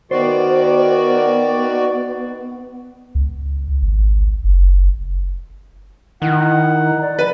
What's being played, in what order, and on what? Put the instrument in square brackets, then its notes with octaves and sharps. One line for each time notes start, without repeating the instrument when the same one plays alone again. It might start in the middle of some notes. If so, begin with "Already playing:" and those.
[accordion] D#3 F#4 D5 [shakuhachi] B3 [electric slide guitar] C5
[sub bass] C#2
G#1
F#1
[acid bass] D#3 [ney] E4 [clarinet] F#5
[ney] A#5
D5
[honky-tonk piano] B4